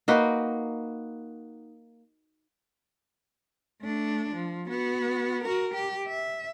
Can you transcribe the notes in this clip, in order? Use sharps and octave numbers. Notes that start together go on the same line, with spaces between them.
A#3 D#4 F#4 B4
A3 D4
F3
B3 F#4
F#4 A#4
G4
E5